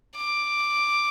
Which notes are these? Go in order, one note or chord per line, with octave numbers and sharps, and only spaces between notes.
D6